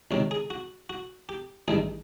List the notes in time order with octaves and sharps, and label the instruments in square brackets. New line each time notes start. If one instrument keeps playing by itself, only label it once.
[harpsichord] C#2 C3 D#3 C#5
G#4
F#4
F#4
G4
A1 G2 D#3 G#4